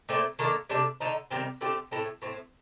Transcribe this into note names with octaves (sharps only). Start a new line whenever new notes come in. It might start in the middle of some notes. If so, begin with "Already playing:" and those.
A#2 A3 C4
D#3 A#3 D4 A4
C3 G3 D4 A4
D3 A3 D#4
C3 D#3 G3 C4
D3 A3 C4 G4
A2 A3 C4
A2 A3 C4